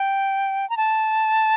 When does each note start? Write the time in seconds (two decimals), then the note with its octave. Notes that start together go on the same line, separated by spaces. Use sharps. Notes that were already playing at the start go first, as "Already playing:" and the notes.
Already playing: G5
0.70 A#5
0.77 A5